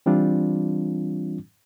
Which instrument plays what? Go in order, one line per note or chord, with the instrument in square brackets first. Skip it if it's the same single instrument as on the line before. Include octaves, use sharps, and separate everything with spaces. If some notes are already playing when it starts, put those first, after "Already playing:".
[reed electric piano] E3 G3 C4 D4 F4